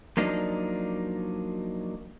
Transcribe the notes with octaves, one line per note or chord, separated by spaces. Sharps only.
F3 F#3 A#3 D4 D#4